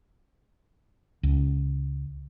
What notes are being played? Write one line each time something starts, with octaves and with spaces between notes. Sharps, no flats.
C#2